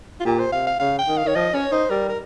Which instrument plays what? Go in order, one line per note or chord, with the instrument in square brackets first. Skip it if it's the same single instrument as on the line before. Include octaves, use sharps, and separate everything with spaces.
[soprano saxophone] F4
[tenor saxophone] A#2 [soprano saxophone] G4
[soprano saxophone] C5
[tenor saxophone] C3 [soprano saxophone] F5
[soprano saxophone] F5
[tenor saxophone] C#3 [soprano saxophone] F5
[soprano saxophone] G5
[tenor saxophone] D#3
[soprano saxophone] F5
[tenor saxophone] D#3 [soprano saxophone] C#5
[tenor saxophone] F3 [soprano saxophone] D#5
[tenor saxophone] C#4 [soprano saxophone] C#5
[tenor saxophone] D#4 [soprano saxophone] C5
[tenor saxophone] G3 [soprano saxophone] A#4
[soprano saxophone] A#4